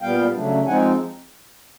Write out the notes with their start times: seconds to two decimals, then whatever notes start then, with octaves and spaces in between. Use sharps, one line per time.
0.02 A#2 G3 B3 F5 G5
0.34 C#3 F#3 A3 D4
0.67 F3 G#3 C4 D#4 F#5 G#5